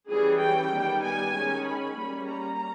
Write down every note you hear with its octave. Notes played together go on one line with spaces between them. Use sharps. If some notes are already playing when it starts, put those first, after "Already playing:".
E3 G3 C#4 G#4
G5
D#3 G3 B3
G#5
D#3 G#3 C#4
B5
G3 A#3 C#4
A#5